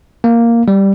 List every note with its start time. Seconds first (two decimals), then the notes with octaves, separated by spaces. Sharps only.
0.24 A#3
0.68 G3